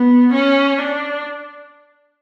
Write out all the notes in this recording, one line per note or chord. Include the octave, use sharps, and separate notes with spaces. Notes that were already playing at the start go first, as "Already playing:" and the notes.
Already playing: B3
C#4
D4